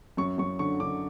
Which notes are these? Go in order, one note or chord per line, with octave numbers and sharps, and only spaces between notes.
F#2 C#6
F#2 C#6
D3 C#6
D3 D6